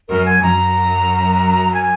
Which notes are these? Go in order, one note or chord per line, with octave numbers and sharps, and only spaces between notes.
F#2 A#4
G#5
F#2 A#5
G#5